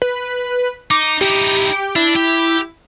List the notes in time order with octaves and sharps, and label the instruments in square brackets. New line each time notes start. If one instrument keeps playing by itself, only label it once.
[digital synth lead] B4
[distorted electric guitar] D#4 [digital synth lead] D6
[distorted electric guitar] D#4 E4 [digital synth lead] G4
[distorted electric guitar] D4 [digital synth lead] E4
[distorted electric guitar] G4